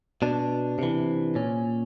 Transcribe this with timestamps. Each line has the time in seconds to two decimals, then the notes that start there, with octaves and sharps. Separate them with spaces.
0.22 B2 D4
0.79 C3 E3
1.35 A#2 C#4